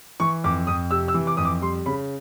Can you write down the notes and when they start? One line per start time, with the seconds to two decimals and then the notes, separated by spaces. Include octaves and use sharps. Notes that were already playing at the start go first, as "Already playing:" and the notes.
0.20 E3 C#6
0.44 F2 D6
0.67 F2 D#6
0.91 C3 E6
1.08 E6
1.14 E3
1.27 D6
1.37 F2 D#6
1.45 D6
1.61 G3 C6
1.86 C#3 B5